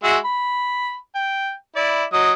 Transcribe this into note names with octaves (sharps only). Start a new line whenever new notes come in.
G#3 F#4 E5
B5
G5
E4 D5
F#3 D#5 D#6